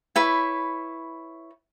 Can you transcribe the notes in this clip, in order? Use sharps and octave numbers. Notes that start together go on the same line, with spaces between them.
E4 B4 C#5